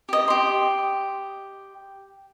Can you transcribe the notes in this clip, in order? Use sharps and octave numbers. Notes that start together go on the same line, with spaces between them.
G4 D#5
G4 C6